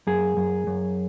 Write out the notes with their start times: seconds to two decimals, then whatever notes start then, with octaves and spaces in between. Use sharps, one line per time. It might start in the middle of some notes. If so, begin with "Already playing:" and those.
0.07 F#2 G#4
0.37 F#2
0.67 F#2